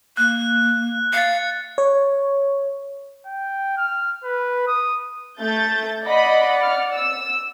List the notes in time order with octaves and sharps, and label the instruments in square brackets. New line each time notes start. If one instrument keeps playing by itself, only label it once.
[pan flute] A#3 [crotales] F#6
[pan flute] F5 [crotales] A6 C#7
[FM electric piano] C#5
[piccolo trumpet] G5
F6
B4
D#6
[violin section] A3 G6 A6
[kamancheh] D5 F#5 [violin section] D#5 B5
[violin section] F6
E6